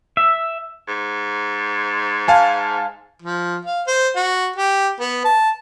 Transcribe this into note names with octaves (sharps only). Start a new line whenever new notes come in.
E5
G#2
F5 G#5 A5
F3
F5
C5
F#4
G4
B3
A5